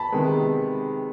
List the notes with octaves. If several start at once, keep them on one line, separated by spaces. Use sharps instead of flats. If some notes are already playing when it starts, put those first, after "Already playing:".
Already playing: A5 B5
C3 D#3 G#3 B3